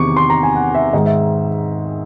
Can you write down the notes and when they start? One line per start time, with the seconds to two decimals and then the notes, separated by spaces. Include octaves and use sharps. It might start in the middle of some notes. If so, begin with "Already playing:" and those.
Already playing: E2 C3 D#3 C#6 D6
0.17 C6
0.30 A#5
0.43 G#5
0.55 F#5
0.75 E5
0.93 G#2 D#3 G#3 D#5
1.06 E5